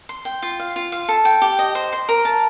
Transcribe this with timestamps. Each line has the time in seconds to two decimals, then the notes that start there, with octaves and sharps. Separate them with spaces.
0.09 C6
0.25 G5
0.42 F4
0.60 F5
0.76 F4
0.92 F5
1.08 A4
1.25 G5
1.42 G4
1.59 D#5
1.75 C5
1.93 C6
2.09 A#4
2.25 A5